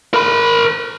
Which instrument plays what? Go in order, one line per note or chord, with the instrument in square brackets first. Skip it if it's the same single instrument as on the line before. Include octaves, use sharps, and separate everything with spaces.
[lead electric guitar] A#4 B5